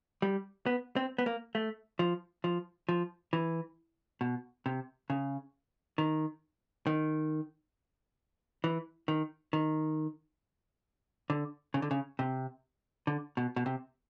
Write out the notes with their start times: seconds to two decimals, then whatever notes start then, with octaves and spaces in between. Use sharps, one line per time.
0.22 G3
0.66 B3
0.96 C4
1.18 B3
1.26 A#3
1.55 A3
1.99 F3
2.44 F3
2.89 F3
3.33 E3
4.21 B2
4.66 C3
5.10 C#3
5.98 D#3
6.87 D#3
8.64 E3
9.08 D#3
9.53 D#3
11.30 D3
11.74 C#3
11.82 D3
11.91 C#3
12.19 C3
13.07 D3
13.37 B2
13.56 B2
13.66 C3